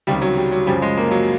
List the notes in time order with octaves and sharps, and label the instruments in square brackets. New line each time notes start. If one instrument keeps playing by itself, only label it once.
[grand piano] C#2 C3 D#3 G3
F#3
G3
F#3
F#2 C#3 F3 G3
G#3
A#3
F#3